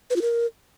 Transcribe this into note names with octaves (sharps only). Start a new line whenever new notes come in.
B4
F4
A#4